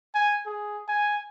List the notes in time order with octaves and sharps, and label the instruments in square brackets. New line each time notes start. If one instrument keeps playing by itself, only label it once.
[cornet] G#5
G#4
G#5